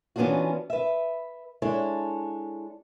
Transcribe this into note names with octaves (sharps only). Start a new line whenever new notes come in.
E3 B3 C#4 D4 F4 F#4
B4 E5
G#3 D4 E4 A4 C#5